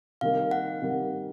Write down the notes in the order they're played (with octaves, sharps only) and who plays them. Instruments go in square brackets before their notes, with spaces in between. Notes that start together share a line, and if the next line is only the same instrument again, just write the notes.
[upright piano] C3 D#3 G3 A#3 [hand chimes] F5
[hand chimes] F#5
[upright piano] C3 D#3 G3 A#3